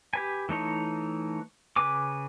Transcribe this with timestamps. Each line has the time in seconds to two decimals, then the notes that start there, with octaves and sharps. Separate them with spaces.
0.13 G4 B4 G#5
0.49 E3 A3 D#4 C#5
1.76 C#3 B4 G#5 D6